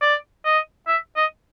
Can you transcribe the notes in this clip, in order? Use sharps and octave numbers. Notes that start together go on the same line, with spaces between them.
D5
D#5
E5
D#5